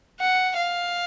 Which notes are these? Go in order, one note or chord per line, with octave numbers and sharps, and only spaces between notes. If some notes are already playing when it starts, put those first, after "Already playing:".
F#5
F5